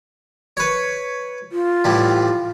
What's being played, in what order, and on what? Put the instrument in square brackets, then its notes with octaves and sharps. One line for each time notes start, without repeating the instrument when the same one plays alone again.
[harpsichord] B4 C#5
[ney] F4
[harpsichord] A2 E3 G3